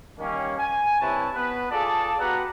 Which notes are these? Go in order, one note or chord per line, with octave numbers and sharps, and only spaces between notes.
D#3 G3 A#3 C#4
G#5
G2 C3 E4 B4 C#5 A5
B3 B4
F4 G#4 A4 D5 A5
B3 F#4 G4 B4 F#5 A#5